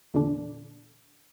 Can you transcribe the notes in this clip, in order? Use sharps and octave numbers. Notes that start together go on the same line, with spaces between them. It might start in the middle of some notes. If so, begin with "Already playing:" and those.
E2 A#2 D3 D4